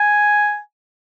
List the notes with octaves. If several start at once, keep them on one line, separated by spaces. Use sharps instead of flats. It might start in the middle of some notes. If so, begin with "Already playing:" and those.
Already playing: G#5